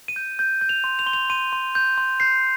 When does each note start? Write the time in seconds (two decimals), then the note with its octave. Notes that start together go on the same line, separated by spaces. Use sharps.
0.08 D#7
0.16 G6
0.39 G6
0.61 G6
0.69 F7
0.84 C6
0.99 F7
1.06 C6 G7
1.13 F7
1.30 C6 D#7
1.53 C6
1.75 G6
1.98 C6
2.20 G6 C7